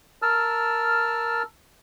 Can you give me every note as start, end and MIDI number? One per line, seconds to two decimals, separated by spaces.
0.22 1.43 70
0.22 1.43 81
0.22 1.43 88
0.22 1.43 89